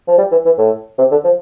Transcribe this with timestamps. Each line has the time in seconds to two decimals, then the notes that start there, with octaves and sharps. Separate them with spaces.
0.07 F3
0.18 G3
0.31 E3
0.45 E3
0.58 A2
0.98 C3
1.11 D3
1.24 F3